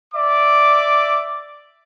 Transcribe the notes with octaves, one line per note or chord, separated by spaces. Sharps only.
D5 E5 D6